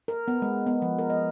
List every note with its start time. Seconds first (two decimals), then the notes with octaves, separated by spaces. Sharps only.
0.08 A#4
0.28 B3
0.42 G#3
0.67 B3
0.82 F3
0.99 A#4
1.10 D#5